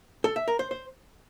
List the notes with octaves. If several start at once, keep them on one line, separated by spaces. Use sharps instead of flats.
A4
E5
A#4
C5
C5